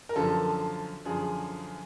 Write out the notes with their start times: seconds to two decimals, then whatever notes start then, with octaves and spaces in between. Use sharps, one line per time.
0.09 A#4
0.16 F#2 D3 F3 A4
1.05 F#2 D3 F3 G#4